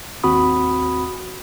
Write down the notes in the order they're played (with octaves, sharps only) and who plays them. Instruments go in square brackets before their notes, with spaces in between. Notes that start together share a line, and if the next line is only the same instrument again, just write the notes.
[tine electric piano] G#1 D#2 C4 F#4 B5 D#6